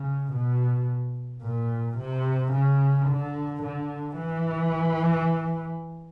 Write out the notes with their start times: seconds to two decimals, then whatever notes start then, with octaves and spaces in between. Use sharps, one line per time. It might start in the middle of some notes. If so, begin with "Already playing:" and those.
Already playing: C#3
0.33 B2
1.43 A#2
1.99 C3
2.52 C#3
3.09 D3
3.63 D3
4.17 E3